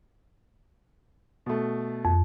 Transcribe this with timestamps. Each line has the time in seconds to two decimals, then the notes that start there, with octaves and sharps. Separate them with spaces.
1.46 B2 A3
2.05 F2